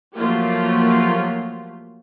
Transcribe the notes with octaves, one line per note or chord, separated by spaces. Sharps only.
F3 F#3 A3 A#3 F4 G4